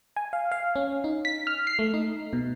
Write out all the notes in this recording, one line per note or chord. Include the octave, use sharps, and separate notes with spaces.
G#5
F5
F5
C#4
D#4
B6
F6
C7
A3
D#4
B2